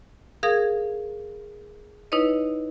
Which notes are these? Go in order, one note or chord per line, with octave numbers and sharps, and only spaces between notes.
G#4 A#4 F5 D#6 G#6
D#4 E4 B4 C#5 D#5